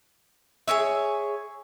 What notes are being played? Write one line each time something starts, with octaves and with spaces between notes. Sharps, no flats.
G#4 A#4 C#5 E5